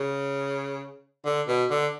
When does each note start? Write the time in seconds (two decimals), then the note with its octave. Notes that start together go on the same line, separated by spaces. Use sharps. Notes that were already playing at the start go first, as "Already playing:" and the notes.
Already playing: C#3
1.26 D3
1.48 B2
1.71 D3